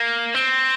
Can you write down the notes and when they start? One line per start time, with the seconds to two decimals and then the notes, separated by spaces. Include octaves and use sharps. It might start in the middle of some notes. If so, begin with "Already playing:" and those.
Already playing: A#3
0.34 C4